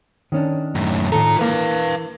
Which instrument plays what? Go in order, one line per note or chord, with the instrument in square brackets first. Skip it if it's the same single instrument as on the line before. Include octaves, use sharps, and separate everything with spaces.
[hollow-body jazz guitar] D#3 C#4 D4
[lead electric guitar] F#2 A2
[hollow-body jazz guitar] A2 D#3 A4 [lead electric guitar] F4 A#5
[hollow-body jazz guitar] E3 A#3 [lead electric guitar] B4 F5